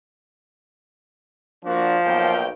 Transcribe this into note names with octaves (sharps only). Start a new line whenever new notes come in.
F3 A#3 D4 F#4
B1 A#3 G5